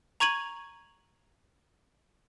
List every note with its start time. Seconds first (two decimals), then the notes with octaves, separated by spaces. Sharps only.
0.20 A#5 C#6 G#6 D#7 F#7